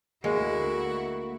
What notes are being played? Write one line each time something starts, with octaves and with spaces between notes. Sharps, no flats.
D2 G#3 A#3 E4 F#4